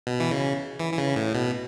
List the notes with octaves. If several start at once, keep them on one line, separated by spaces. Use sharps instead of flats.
B2
E3
C#3
E3
E3
C#3
A2
B2